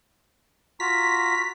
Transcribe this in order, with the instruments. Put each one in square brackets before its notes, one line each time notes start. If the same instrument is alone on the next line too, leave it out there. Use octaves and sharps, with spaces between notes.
[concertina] F4 F#4 A#5 [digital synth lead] B6